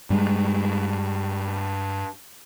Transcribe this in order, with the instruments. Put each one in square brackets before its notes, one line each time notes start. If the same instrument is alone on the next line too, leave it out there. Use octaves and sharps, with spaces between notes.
[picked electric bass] G2 G3 G#3